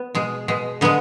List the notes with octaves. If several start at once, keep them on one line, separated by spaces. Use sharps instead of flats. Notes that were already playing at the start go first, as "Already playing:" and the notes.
Already playing: B3
B2 G#3
B2 G#3
D3 G#3 B3